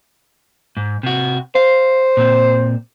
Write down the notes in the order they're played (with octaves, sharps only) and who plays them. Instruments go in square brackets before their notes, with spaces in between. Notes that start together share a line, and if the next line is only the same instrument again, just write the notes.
[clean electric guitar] G#2
C3 F#4
[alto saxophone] C5 [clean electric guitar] F5
[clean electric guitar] A#2 C4